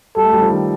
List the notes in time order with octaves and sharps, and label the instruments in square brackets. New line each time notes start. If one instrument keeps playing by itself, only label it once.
[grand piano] G3 [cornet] A4
[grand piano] A3
G3
F3
D#3